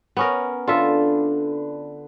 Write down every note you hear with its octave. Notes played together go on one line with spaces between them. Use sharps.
B3 C#4 A#4
D3 F4 A4 B4 E5